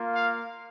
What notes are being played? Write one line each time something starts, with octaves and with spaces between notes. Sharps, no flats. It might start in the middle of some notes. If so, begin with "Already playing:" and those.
Already playing: A#3 F4
F5